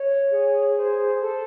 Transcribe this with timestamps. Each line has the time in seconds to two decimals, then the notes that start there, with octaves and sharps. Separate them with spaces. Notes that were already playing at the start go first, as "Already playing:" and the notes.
Already playing: C#5
0.31 G#4
0.75 C5
1.21 A4